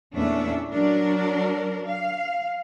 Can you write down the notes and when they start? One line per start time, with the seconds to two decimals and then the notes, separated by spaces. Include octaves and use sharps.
0.13 E2 A#2 A3 C#4 D4 E5
0.70 F#3 D4 A#4
1.84 F5